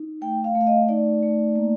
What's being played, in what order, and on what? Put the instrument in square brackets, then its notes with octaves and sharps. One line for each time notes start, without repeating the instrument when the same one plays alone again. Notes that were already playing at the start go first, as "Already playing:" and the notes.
Already playing: [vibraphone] D#4
A3 G5
F5
A3
F5
D#5
D#4 D5
A3
A#3